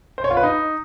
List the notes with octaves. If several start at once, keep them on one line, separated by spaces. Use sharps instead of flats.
C5
C#5
F4
B4
D#4